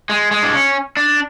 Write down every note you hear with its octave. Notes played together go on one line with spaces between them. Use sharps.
G#3
G#3
D4
C#4
D4